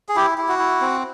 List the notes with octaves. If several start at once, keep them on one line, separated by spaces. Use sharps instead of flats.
G#4
E4 G4
E4
F#4
E4
C4